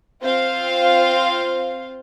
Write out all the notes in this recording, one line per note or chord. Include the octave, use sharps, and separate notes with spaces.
C4 F4 C5 F5